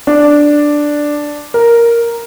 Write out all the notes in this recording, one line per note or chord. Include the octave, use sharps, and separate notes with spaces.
D4
A#4